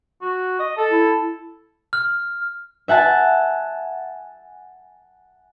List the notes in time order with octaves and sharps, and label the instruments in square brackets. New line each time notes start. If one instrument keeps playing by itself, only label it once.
[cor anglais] F#4
D#5
A4
[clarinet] E4
[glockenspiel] F6
[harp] E5 F#5 G#5 A5